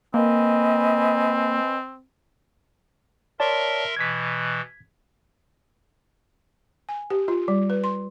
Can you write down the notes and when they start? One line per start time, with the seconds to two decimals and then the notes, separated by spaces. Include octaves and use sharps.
0.14 A#3 C4 B4 D#5 G#5
3.40 A#4 C#5 D5 E5 A5 C6
3.97 B2 E3 G#6 B6
6.89 G#5
7.10 G4
7.28 F4
7.48 G3
7.70 B4
7.84 C6